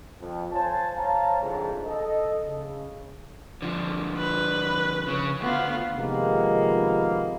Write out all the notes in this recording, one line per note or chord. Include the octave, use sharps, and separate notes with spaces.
F2
C5 C#5 F5 G#5 A5
C5 C#5 F5 A5 A#5
C2 F2 G#2 D3
A4 D#5
C#3
D3 F3
B4
C#3 C#4
D2 B3 F4
C3 D#3 F3 G#3 A#3 B3